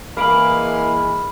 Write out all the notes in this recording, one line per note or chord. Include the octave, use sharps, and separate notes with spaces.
E3 G#3 A#3 B5 F6 D7 F#7